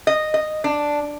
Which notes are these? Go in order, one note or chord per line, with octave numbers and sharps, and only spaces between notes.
D#5
D#5
D4